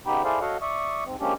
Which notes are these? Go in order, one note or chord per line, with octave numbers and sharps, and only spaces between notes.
C#3 B3 D#4 G4 G5 B5
E4 G#4 A4 C5 D5 F5
F#4 A4 C#5 D#5 F5 F#5
D5 E5 C#6 D#6
G#2 C4
F3 G#3 A#3 C#4 D4 G4